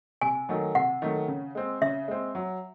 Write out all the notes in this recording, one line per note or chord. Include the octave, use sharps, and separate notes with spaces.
C3 G#5
D#3 F#3 A3
C3 F#5
D#3 F#3 A3
C#3
G#3 C4
C#3 E5
G#3 C4
F#3